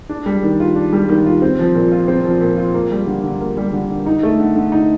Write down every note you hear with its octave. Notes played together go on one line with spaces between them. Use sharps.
D4
G3
D#3
F4
D4
G3
D#3
F4
C4
F3
A#2
F4
C4
F3
A#2
F4
A#3
G3
D3
D3
A#3
G3
D3
D3
D#4
A3
D3
D3
D#4